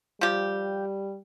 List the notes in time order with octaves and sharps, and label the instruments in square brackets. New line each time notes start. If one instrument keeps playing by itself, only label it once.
[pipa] F3 G4 [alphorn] G3